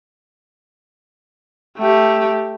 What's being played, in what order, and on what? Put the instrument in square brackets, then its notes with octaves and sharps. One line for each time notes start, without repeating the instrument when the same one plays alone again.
[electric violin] A3 G4